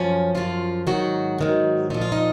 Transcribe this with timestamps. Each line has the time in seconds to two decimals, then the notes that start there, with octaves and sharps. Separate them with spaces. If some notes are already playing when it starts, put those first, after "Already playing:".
Already playing: F#2 F3 C#4
0.35 F#2 F3 F4
0.87 G#2 D#3 F#3 F#4
1.38 G#2 D#3 F#3
1.90 A#2 F3 D#4
2.01 F4
2.12 D#4